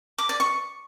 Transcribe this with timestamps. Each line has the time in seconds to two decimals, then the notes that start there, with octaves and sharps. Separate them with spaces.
0.18 D6
0.29 D5
0.40 C#6